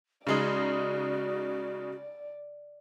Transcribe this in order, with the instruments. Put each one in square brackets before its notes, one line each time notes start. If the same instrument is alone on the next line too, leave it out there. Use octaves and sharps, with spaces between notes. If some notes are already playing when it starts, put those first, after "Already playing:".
[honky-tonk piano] C#3 G#3 D#4 [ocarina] F#4 [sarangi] D5